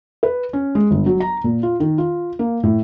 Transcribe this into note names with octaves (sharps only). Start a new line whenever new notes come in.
B4
C#4
G#3
G1
F#3
A#5
A#2
F4
D#3
F4
A#3
A2